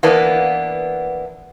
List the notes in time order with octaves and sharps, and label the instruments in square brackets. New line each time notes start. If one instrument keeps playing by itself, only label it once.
[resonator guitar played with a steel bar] E3 A#3 B3 D4